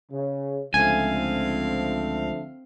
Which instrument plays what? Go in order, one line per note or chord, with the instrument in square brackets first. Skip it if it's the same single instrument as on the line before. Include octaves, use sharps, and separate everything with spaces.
[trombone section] C#3
[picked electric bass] C#2 [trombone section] D3 F3 A3 [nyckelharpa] C4 F5 [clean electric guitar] G#5